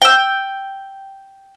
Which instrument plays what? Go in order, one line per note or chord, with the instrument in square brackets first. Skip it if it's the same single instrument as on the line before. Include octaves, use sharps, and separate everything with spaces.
[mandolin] G5 E6